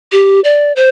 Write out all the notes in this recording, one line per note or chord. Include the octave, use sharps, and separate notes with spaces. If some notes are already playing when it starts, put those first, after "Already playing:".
G4
D5
C5